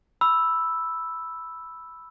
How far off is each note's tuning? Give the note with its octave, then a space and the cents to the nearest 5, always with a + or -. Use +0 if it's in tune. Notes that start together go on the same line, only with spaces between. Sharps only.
B5 +0 E6 +0